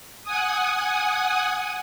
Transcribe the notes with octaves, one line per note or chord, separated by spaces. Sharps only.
F#5 G#5 D#6